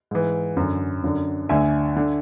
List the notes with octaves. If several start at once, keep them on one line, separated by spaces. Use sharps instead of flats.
G#2 E3
F#2 D3
F#2 D3
D2 D3 E5 G#5
D3